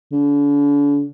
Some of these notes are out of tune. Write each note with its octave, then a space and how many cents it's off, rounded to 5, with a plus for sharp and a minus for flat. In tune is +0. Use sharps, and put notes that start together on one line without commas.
D3 -40